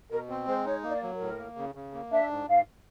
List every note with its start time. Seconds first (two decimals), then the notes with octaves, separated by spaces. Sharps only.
0.10 B2 A#4
0.28 C4 C5
0.47 G#3 C5
0.65 D#4 C#5
0.83 A#3
0.89 D5
1.03 F#3
1.14 A#4
1.20 A2
1.39 A#3
1.57 C#3
1.75 C#3
1.94 A#3
2.12 D4 E5
2.30 G#2
2.48 G#2 F5